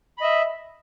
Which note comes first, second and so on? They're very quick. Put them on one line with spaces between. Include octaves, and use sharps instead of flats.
B5 D#5 E5